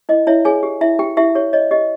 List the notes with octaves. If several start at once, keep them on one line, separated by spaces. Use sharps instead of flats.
E4 D#5
E4 C#5 E5
G#4 C#5 G#5
G4
E4 E5
E4 G4 G5
E4 G4 E5
G4 C#5
C#5 D#5
G4 D#5